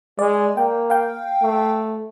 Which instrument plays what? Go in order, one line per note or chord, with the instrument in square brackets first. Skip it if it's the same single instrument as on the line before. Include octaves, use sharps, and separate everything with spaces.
[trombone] G#3 [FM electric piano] D5
[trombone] A#3 [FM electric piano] G5
[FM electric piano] F5 G5
[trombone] A3